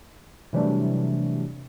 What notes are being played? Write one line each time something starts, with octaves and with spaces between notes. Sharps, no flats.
C3 E3 F#3 G3 A3 D4